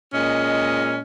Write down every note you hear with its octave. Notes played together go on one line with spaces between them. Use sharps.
A#2 G#3 C#4 D#5